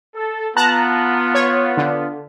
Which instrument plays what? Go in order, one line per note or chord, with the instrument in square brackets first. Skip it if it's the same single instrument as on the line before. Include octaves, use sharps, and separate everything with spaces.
[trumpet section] A4
[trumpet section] B3 F4 [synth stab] A5 A#5 F#6
[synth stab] C#5
D3